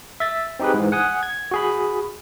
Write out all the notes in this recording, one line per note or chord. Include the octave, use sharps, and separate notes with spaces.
E5 A6
C4 D#4 G4 G#4 B4
G#2 E3
F#5 G#5 D#6
G#6
F#4 G#4 B5